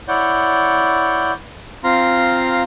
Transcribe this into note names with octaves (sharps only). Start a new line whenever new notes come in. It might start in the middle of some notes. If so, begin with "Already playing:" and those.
E4 C#5 D5 F#5 G6
C4 F4 F5 A#5 C6